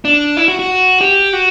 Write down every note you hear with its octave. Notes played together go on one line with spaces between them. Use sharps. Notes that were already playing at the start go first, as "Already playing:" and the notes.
D4
E4
F#4
F#4
G4
F#4